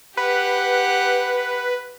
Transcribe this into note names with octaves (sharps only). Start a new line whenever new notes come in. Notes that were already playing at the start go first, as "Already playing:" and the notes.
G4 B4 F#5